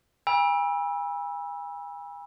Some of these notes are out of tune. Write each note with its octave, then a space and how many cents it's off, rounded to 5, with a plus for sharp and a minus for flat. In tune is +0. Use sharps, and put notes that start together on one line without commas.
G#5 -40 B5 -35 E6 +0